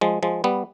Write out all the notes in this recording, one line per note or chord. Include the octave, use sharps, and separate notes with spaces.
F3 G#3
F3 G#3
G3 B3